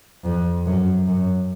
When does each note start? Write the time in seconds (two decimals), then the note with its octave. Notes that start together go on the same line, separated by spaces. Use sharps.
0.25 F2
0.66 F#2
1.08 F#2